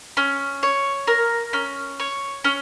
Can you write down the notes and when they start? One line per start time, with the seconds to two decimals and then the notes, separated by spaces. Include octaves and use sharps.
0.17 C#4
0.63 C#5
1.08 A#4
1.53 C#4
2.00 C#5
2.45 C#4